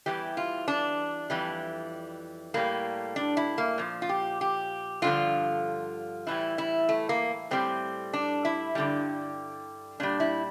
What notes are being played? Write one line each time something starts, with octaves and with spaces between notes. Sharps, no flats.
E2 C3 E3 G3 G4
F4
D4
F2 E3 G3
A2 G3 A#3
D4
E4
A#3
A#2 F3
F4
G4
G4
G2 D3 F3 F4
A2 E3 G3 E4
E4
A3
A#3
A2 G3 C4
D4
E4
G2 D3 G3
A#2 G3 D4
E4